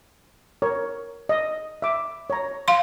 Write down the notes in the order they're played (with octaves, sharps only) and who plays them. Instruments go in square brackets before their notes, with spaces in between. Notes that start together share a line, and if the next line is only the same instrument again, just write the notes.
[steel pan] A#4 C#5
D#5
E5 D6
C#5 A#5
[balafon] F5 C6